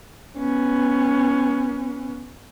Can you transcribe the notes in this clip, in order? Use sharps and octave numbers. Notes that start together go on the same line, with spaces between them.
B3 C#4